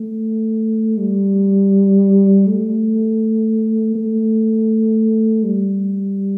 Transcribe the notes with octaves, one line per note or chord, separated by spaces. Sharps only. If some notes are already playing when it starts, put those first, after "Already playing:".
Already playing: A3
G3
A3
A3
G3